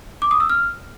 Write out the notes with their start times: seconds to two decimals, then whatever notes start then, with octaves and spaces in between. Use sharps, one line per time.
0.22 D6
0.31 D#6
0.40 E6
0.50 F6